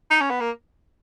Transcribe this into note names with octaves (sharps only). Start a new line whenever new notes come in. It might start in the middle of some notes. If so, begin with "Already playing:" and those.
D#4
C#4
B3
A#3